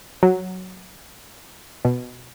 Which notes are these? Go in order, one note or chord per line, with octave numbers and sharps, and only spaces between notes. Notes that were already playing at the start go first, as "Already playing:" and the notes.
F#3
B2